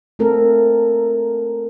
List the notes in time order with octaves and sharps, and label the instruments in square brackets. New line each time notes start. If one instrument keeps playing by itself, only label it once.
[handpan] A3 C4 A4 A#4